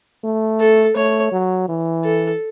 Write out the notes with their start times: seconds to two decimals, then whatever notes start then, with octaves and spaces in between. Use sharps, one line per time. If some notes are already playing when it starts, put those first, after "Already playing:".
0.24 A3
0.60 A4
0.96 A3 C#5
1.32 F#3
1.69 E3
2.04 A4